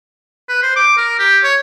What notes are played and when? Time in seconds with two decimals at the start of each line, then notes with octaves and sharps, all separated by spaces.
0.49 B4
0.63 C5
0.76 D6
0.97 A#4
1.19 G4
1.43 C#5